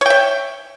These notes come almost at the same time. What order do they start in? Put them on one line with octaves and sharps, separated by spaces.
C#5 G5 E5